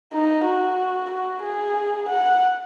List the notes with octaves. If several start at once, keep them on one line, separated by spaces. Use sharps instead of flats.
D#4
F#4
F#4
G#4
F#5